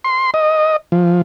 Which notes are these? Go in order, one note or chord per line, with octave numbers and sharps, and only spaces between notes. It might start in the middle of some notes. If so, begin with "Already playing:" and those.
C6
D#5
F3